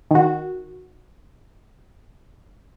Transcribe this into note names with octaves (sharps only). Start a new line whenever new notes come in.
D#3 F#4